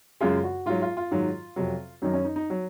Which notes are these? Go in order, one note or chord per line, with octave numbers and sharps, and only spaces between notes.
F#2 C#3 G#3 F4
F#4
G#2 F#3 F4
F4
F4
G#2 D#3 F#3
F2 C3 F#3
F#2 D#3 F#3 D#4
C#4
D#4
D#4
F#3